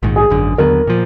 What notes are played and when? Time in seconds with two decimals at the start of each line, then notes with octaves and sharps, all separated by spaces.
0.03 A#1 G#2 D#3
0.16 G#4
0.30 G#1 F#2 D3
0.58 D#2 D3 F#3 B3 A#4
0.87 A#2 F3